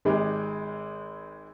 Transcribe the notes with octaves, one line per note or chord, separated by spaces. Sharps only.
G#1 G#3 G4